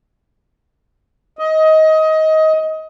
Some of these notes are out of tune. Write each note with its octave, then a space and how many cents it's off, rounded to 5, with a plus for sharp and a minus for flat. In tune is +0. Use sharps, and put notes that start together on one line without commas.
D#5 +20